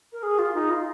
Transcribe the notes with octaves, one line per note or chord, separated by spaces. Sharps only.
A#4
G#4
F4
D#4
F4